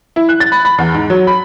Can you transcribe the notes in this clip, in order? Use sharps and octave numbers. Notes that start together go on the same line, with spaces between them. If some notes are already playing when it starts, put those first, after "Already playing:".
E4
F#6
A6
B5
B5
E2
G#2
F#3
B5